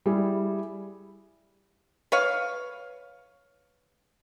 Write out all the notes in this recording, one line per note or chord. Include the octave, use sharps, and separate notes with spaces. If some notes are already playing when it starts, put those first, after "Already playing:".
G3 E4 G#4
B4 C#5 F5